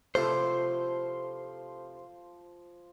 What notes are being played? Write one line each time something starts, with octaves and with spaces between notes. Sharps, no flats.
C3 F3 A3 E4 C5 F5 C6